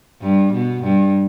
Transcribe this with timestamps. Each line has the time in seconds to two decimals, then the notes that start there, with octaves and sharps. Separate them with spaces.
0.22 G2
0.53 B2
0.83 G2